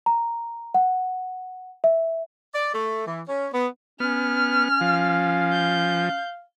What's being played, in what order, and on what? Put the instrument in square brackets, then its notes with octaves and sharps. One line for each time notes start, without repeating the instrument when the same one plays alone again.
[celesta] A#5
F#5
E5
[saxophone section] D5
A3
E3
C#4
B3
[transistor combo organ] B3 [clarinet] C#4 [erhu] F6
[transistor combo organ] F3 [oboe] F5
[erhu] G6